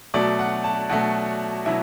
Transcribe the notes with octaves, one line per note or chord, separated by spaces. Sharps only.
B2 F#3 A3 D5
F#5
A5
B2 F#3 A3 F#4
B2 F#3 E4